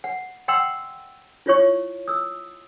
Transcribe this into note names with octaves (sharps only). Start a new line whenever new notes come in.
F#5
D#5 F#5 G5 A#5 C6 E6
E4 F4 C#5 C#6
D#6 E6